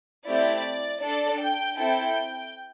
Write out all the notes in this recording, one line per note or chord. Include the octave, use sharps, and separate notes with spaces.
A3 C4 E4 G4 D5
D4 A4 D5
G5
C4 E4 A4 G5